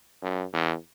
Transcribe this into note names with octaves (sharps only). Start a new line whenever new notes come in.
F#2
E2